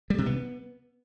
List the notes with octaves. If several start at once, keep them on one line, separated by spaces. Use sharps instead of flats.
G3
C3
B3